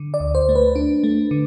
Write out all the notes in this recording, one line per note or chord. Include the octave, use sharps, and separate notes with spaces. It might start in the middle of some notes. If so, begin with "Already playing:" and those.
Already playing: D3
D5
D2
C5
A3
B4
D4
A3
D3